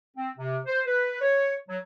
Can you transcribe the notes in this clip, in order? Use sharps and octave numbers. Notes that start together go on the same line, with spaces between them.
C4
C3
C5
B4
C#5
F#3